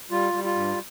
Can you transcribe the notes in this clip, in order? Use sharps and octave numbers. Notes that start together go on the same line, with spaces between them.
G3 F4
G3
F4
G2